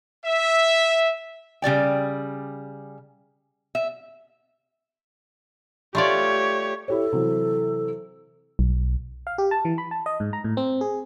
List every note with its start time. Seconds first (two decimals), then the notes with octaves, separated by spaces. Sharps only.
0.25 E5
1.62 C#3 G3 D5 G5
3.75 E5
5.95 A3 F4 G4 C#5 D5
6.88 E4 G4 A4 C#5
7.13 C3 E3 F#3
8.59 B1
9.27 F5
9.38 G4
9.51 A5
9.65 E3
9.78 B5
9.91 A5
10.06 D#5
10.20 G#2
10.33 A#5
10.44 A2
10.57 C4
10.81 G#4